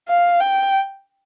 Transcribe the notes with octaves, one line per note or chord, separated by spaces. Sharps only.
F5
G5